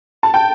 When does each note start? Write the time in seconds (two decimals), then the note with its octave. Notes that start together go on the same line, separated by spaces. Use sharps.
0.23 A5
0.34 G5